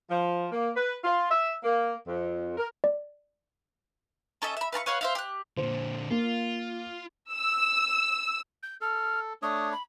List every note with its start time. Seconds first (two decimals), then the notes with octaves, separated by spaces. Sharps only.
0.10 F3
0.52 A#3
0.76 B4
1.04 F4
1.31 E5
1.63 A#3
2.07 F2
2.57 A#4
2.84 D5
4.42 C#4 A4 D#5 E5
4.57 E5 B5
4.73 B4 F5 A5 C#6
4.86 B4 C#5 F5 F#5
5.01 C5 E5 F5
5.15 G4 F#6
5.57 A#2 D3 C5
6.10 A#3 F4
7.32 E6
8.63 G6
8.81 A4 F6
9.42 A3 D4 C#5 D#6
9.72 B5